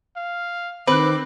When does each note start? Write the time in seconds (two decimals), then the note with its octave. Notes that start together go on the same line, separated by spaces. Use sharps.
0.16 F5
0.87 D#3 C4 B4 D6 F#6